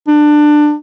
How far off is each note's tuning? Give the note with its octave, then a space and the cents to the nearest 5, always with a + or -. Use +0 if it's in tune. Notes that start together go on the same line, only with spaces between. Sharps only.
D4 +20